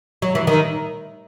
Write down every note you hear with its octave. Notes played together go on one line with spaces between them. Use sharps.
F#3
E3
D#3